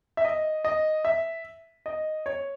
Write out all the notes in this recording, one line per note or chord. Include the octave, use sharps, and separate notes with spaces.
E5
D#5
D#5
E5
D#5
C#5